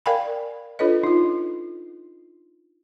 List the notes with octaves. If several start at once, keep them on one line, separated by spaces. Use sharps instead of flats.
A#4 D5 F5 G5 G#5 B5
D4 F4 A4 B4 C#5 D#5
D#4 F4